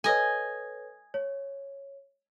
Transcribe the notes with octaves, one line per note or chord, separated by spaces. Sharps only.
A4 B4 C#5 D#5 G#5
C#5